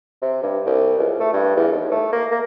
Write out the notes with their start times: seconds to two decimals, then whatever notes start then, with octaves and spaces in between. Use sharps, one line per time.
0.22 C3
0.43 G2
0.66 C2
0.99 C#2
1.20 A3
1.33 G2
1.56 E2
1.72 D#2
1.91 A3
2.12 A#3
2.31 A#3